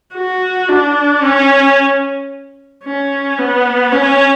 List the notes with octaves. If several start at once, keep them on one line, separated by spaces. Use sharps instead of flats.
F#4
D4
C#4
C#4
B3
C#4